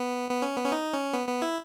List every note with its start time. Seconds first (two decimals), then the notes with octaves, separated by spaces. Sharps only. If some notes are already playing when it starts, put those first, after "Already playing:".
Already playing: B3
0.30 B3
0.42 C#4
0.57 B3
0.65 C#4
0.72 D#4
0.93 C#4
1.13 B3
1.27 B3
1.42 E4